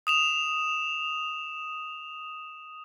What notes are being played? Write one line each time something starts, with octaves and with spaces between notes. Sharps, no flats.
D#6 E7 F7